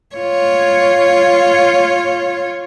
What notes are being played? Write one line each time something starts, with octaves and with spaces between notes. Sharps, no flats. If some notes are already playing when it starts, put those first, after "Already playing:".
F4 C#5